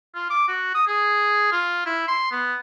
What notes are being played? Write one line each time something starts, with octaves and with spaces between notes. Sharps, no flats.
F4
D6
F#4
D#6
G#4
F4
E4
C6
B3